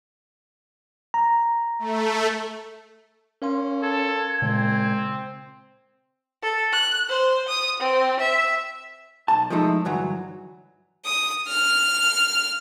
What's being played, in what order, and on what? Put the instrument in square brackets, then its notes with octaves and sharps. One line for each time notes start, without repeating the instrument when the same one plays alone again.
[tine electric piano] A#5
[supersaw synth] A3
[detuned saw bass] C#4 [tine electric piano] A#4 F5 C6
[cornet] A4 [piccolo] G#6
[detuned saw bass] A#2 [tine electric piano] C#3 G#3 [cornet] C4
[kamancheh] A4
F#6
C5
D#6
C4
E5
[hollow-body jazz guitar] B1 A5
F3 G#3 A3 D#4 E4
D2 G2 E3 F#3
[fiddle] D#6
F6